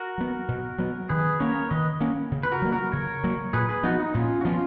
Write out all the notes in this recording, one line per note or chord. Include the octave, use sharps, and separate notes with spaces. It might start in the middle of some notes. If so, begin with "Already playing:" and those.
Already playing: F#4 A#4
F#3 B3
B2
F#3 B3
D#3 G#4 B4
A#3 C#4 A#4 C#5
D#3 B4 D#5
A#3 C#4
C#3
B4
F#4 A#4
F#3 A#3
F#4 A#4
C#3 A#4 C#5
F#3 A#3
A#2 G#4 B4
G#4 B4
F3 B3 D#4 F#4
D#4
A#2 C#4 F4
F#4
F3 B3 C#4 F4